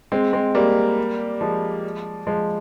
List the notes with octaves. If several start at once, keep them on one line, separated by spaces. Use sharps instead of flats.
G#3 C4
G#3 C4
G3 A#3
F3 G#3
F3 G#3